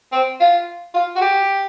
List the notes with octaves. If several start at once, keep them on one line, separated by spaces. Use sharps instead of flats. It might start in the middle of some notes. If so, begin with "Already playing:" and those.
C4
F4
F4
F#4
G4